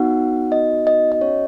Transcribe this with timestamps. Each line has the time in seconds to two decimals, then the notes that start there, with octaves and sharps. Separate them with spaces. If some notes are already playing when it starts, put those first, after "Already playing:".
Already playing: B3 D#4 F#4 F#5
0.52 D#5
0.87 D#5
1.12 D#5
1.21 C#4 F#4 C#5